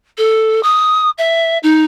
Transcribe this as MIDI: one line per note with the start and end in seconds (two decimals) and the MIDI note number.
0.18 0.62 69
0.63 1.10 87
1.18 1.58 76
1.63 1.84 63